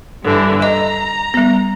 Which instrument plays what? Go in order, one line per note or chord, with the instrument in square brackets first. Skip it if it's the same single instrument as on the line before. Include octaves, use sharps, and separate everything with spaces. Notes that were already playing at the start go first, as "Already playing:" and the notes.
[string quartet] G2 D3 E3
[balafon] D#5 [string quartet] A#5
[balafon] G3 B3